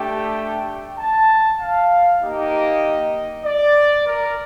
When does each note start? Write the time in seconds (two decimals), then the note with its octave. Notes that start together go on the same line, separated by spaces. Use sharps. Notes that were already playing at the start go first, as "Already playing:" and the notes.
Already playing: A3 D4 G4 G5
0.98 A5
1.60 F5
2.22 A#3 D#4 G4 D#5
3.45 D5
4.07 A#4